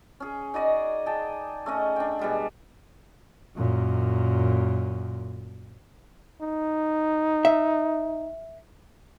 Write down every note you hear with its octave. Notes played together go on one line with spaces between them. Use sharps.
C#4 G#4
D#4 F#4 D5 D#5
G#4 G5 A5
A3 C#4 D#5
D4 G5
B2 G3 G#3
F#2 A#2
D#4
E5